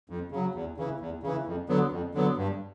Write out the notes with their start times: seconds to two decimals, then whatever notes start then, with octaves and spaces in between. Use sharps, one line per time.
0.10 F2
0.31 C#3 F#3
0.55 E2
0.77 C#3 E3
1.00 E2
1.23 C#3 E3
1.46 F2
1.69 D3 F#3 B3
1.92 F2
2.14 D3 F#3 B3
2.37 G2